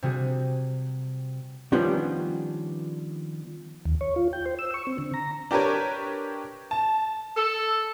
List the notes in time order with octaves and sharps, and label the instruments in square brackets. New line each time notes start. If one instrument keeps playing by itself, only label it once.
[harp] C3 G3 F#4 G#4
[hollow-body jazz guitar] D#3 F3 G3 B3 C#4 D4
[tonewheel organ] D#2
C#5
F4
G5
C5
E6
C#6
C4
D3
A#5
[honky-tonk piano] D4 G4 A#4 B4 C#5
A5
[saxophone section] A4